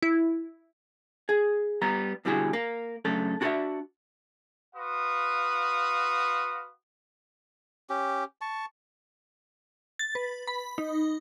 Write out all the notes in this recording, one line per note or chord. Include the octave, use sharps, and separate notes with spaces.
E4
G#4
G3 B3 A#5
B2 D3 G3 E4 F#4 G#4
A#3
F#2 C#3 A3 D4 A4
D4 F#4 G#4 C5 D5 E5
F#4 B4 F5 C6 D#6
C#4 G4
A5 C#6
A6
B4
B5
D#4